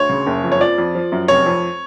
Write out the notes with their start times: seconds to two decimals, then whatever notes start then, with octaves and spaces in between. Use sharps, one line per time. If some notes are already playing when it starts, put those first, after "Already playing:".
Already playing: D2 C#5
0.09 C#3
0.26 F#1
0.44 F2
0.52 C#5
0.60 F3 D5
0.78 F2
0.95 F3
1.12 F#2
1.28 F1 C#5
1.46 F2